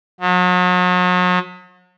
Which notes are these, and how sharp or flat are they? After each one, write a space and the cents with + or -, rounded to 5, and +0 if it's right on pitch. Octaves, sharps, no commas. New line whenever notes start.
F#3 -40